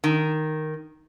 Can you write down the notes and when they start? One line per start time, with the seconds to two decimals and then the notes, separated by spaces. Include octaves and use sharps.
0.04 D#3